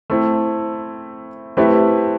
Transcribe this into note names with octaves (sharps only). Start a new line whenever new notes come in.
A3 C4 E4
A3 C4 E4 G4 B4